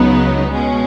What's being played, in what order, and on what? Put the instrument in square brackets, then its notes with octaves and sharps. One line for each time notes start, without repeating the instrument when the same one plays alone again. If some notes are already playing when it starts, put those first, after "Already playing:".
Already playing: [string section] C#2 C#3 F#3 B3 D#4
B2 G#3 C#4